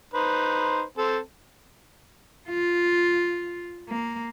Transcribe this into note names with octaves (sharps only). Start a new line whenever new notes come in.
D#4 B4 C5
C4 A4
F4
A#3